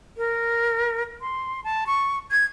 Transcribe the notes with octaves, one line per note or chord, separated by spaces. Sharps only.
A#4
C6
A5
C#6
G#6